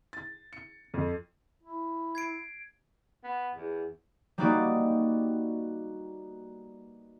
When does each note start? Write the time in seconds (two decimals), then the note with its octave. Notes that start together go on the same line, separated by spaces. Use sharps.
0.13 A6
0.53 C#7
0.94 F2
1.63 E4
2.15 G#6 C7 D7
3.24 B3
3.55 E2
4.38 G3 A#3 B3 D#4 F#4 D5